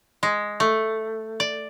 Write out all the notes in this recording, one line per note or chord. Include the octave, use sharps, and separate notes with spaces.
G#3
A3
D5